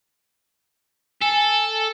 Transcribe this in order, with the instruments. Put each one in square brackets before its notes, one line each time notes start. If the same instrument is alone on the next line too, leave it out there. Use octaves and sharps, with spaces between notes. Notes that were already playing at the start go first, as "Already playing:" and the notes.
[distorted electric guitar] A4 [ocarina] G#5